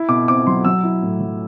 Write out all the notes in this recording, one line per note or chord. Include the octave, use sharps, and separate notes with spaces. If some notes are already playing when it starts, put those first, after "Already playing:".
Already playing: E4
B2 D6
C4 D6
F#3 C6
F#3 E6
E4
A2
F#3